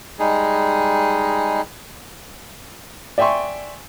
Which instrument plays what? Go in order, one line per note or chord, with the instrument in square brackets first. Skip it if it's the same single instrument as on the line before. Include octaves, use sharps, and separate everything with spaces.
[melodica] G3 G#3 D#4 G#4
[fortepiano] D5 E5 G5 G#5 C6 C#6